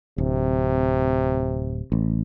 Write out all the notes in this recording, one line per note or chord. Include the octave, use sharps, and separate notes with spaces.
D1 C3
A1